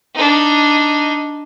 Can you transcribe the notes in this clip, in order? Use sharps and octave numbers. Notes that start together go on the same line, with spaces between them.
D4 D#4